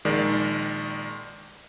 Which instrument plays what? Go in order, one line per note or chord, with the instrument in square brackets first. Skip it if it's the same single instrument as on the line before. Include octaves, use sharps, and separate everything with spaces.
[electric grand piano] A#1 D#3 G#3 D5